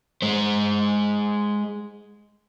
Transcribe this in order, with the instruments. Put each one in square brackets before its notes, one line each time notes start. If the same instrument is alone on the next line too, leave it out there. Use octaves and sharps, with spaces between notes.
[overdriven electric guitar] G#3 C5